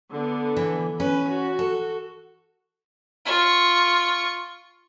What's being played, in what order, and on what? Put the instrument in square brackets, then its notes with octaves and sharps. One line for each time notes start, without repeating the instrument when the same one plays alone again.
[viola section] D3 B3
[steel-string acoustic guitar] E3
[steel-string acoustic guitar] C#4 [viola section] B4
[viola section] F#4
[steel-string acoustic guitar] A4
[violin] F4 C#6